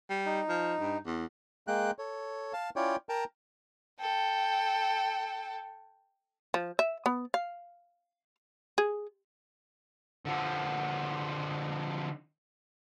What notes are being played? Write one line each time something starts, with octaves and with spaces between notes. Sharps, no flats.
G3
D#4
F3
G2
E2
G#3 A#3 G5 F#6
A4 C#5
F5 A5
C#4 E4 F4 C#5 D5 G5
A#4 G5 A5 A#5
A4 G5
F3
E5
B3
F5
G#4
D3 F3